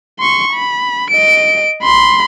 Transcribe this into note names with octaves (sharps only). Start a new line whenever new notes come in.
C6 C#6
B5
D#5 D7
B5 C6